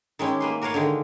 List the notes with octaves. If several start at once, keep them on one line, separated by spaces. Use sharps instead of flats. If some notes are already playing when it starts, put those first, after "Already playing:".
D#3 G#3 C#4 E4 G4
A#3 B4 C6
F#4 A#4 B4 C#5 F5 F#5
D3 D#3 G#3